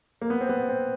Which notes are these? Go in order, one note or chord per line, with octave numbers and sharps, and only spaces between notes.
A#3
B3
C4
B3
C4